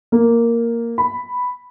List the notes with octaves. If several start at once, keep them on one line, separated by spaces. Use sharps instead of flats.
A#3
B5